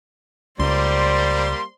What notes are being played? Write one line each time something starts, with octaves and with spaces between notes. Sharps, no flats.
C#2 G3 A#3 C5 D5 C6